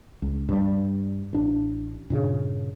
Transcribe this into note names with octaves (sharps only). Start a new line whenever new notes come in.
C#2
G2 G3
A1 D4
G2 A#2 C#3